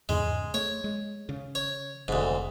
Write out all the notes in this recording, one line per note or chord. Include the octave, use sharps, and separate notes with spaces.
E2 G#2 C#3 G#3
A3 C#5
G#3
C#3
C#5
F1 D2 G#2 C3